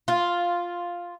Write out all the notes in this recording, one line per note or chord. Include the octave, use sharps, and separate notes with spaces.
F4